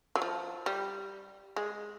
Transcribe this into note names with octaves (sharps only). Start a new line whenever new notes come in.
F#3
F3
G3
G#3